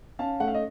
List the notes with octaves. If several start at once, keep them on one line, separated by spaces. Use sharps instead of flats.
C#4 F5 A5
A3 F#5
F5
D#5